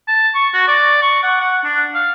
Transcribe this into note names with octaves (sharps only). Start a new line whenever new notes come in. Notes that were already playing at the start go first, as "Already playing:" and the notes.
A5
C#6
F#4
D5
C#6
F#5
F#5
D4
F5